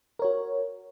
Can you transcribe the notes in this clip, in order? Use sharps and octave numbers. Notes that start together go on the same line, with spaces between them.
F#4 A#4 C#5